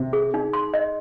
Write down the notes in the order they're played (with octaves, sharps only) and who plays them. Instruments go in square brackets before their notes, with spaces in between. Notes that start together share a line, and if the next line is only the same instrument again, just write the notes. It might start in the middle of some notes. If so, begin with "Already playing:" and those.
Already playing: [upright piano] C3
[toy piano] G#4
D#4
C6
D#5